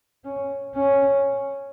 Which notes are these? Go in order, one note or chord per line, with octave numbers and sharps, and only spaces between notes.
C#4
C#4